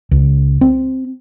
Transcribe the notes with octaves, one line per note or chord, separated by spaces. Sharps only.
C#2
C4